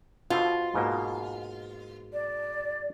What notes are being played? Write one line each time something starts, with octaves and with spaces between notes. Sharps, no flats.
B2 F4 A4 C5
G#2 B2 A#3
D5